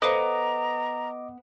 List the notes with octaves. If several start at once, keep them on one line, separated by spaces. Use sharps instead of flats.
B3 A4 C5 D#5 F5 A#5 D6